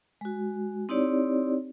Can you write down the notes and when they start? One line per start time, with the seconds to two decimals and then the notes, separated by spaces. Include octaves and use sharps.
0.21 G#3 F#4
0.89 C4 D#4 E4 G4 C#5 D5